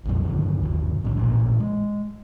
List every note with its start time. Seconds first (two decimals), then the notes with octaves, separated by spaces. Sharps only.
0.05 A#1 F2 G3
0.23 C#2 G2 D3 D#3
0.63 G1 D#2
1.04 C2 A2 G3
1.17 A1 A#2
1.60 G#3